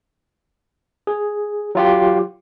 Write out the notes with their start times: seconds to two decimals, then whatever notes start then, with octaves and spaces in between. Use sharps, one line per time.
1.07 G#4
1.75 F#3 F4 G4